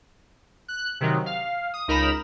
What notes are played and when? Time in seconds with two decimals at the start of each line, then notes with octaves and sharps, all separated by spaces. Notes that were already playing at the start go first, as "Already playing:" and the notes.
0.68 F#6
1.01 C3 D#3 F#3
1.26 F5
1.74 D#6
1.88 C#2 D#4 A#4 A#5 B5 E7